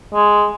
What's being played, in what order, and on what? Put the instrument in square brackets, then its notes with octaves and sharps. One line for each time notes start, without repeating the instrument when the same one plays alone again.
[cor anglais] G#3